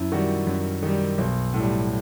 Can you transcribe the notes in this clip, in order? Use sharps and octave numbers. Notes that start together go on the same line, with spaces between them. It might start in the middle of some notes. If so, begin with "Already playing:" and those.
Already playing: F#2 E4
D#3 G3 F#4
F#2
D#3 G3
B1
A2 G3